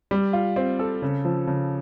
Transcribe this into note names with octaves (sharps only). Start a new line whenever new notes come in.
G3
F4
C4
A4
C#3
F3
C#3